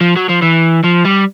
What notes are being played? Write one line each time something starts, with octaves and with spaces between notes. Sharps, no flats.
F3
F#3
F3
E3
F3
G3